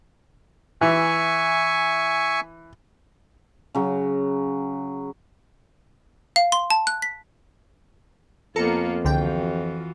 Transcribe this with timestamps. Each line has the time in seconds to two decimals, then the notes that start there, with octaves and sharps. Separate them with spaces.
0.81 E3 E5 G#5 C#6
3.75 C#3 F#3
6.36 F5
6.52 C6
6.70 A5
6.87 F#6
7.02 B6
8.56 F2 A#3 B3 F4 A4 A#5 C#7
9.05 C#2 D3 E3 F4 F#4 G5